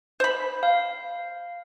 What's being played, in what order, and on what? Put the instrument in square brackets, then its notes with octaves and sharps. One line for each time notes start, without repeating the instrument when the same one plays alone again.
[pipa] C5 B5
[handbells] F5